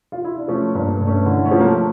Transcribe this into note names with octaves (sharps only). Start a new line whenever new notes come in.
F4
E4
D4
F3 A3 C#4
G2 A#3
A3
G2
A3 C#4
D3 C#4 E4
A3 C#4
F3
A#3
A3